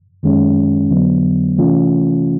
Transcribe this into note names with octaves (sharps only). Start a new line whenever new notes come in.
F#2 D#3 G#3 C#4
F2 D3 F#3 B3
C3 E3 A3 C#4 F4